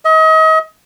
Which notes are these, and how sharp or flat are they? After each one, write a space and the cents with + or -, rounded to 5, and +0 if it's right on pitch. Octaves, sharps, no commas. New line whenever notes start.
D#5 +35